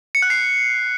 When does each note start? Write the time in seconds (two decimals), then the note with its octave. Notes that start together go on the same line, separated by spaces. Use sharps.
0.15 C#7
0.22 F#6
0.30 C7